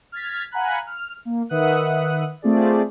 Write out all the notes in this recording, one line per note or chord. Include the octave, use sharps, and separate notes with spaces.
F6 G#6 A6 B6
F5 F#5 G#5 A#5 B5 F#6
F6
A#3
D#3 B4 E5 F#5 D#6 F#6
A3 C4 F4 G#4 D5